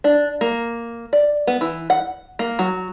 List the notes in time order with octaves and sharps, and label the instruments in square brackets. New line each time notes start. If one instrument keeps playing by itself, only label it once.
[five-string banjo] D4
A#3
D5
B3
E3
F#5
A#3
F#3